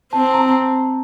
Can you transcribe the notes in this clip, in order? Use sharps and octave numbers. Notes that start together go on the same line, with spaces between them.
C4 A5
A5
A#5
A5